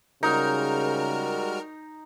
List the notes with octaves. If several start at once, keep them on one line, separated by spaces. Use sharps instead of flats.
C#3 G3 G#3 D#4 F#4 A#4 A#5 F6